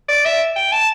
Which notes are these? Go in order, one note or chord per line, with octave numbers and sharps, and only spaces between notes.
D5
E5
G5
A5